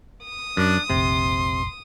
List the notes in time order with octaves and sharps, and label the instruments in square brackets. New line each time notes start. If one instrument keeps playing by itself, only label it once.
[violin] D#6
[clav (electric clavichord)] F#2 [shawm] D4
[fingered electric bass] F1 A#1 [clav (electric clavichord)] C3 [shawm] C6